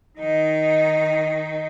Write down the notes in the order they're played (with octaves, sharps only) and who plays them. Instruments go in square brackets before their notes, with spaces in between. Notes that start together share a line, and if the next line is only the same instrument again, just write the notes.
[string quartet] D#3 D#4